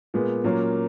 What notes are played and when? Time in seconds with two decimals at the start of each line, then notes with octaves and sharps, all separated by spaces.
0.14 A#2 G#3 B3
0.44 A#2 F#3 A#3 C#4